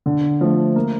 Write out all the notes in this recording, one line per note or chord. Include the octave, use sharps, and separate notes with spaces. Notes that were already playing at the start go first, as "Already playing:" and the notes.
D3
F3 A3
A#3